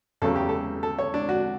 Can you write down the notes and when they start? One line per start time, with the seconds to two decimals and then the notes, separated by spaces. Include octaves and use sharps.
0.22 E2 C#3 F#3 A3 A4
0.36 G4
0.49 A4
0.83 A4
0.99 C#5
1.14 D4
1.29 F#4